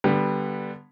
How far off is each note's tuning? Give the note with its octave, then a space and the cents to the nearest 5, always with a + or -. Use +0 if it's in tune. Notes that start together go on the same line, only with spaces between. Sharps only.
D3 +0 G3 +0 B3 -15